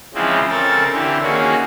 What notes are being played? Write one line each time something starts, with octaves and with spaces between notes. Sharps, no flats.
C#3 E3 F3 G#3 C4
C#3 C4 A4 A#4 A6
D3 E3 C4 G4
D#3 A#3 C#4 F#4 G#4